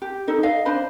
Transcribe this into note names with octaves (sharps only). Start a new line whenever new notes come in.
G4
D#4 A4 D#5
D#5 F5
D4 C5 B5